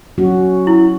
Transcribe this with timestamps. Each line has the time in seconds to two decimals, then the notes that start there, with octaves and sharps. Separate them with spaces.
0.18 F#3 C#4 F#4
0.67 E4